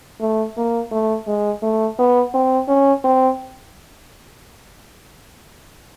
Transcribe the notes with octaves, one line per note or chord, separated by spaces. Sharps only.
A3
A#3
A3
G#3
A3
B3
C4
C#4
C4